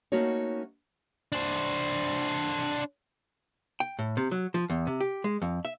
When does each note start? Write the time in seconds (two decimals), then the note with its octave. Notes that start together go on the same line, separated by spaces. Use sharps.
0.12 A3 A#3 C#4 D#4 F#4 C#5
1.32 D4 C5
3.80 G5
3.99 A2
4.17 C3
4.31 F#3
4.54 F3
4.70 E2
4.87 C3
5.01 G4
5.24 G#3
5.42 F2
5.65 E5